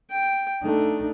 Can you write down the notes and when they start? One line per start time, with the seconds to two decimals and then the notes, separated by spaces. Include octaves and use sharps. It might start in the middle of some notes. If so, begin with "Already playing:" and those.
0.10 G5
0.62 A3 D4 D#4